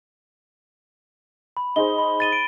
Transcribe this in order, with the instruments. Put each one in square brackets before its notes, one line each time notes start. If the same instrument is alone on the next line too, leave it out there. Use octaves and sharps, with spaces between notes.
[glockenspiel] B5
[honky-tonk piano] D#4 G#4 C5 [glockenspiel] G7
[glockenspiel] B5
A6 D#7 G7
D7